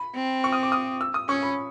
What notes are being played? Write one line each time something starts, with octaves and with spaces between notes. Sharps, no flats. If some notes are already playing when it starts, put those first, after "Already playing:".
Already playing: B5
C4
C#6
D#6
D6
D#6
E6
D#6
C#4 C#6
B5